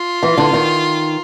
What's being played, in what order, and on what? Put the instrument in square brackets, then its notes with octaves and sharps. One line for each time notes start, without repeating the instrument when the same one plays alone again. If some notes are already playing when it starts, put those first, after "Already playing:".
Already playing: [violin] F4
[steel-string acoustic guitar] E3
D3
D#3